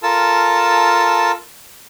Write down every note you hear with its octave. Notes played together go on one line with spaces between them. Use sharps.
F4 A4 A#4 A5 E6